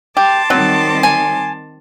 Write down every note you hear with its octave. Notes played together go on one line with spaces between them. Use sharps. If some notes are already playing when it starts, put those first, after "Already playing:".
G4 A5 C6 D6
D#3 F#3 G3 C4
G#5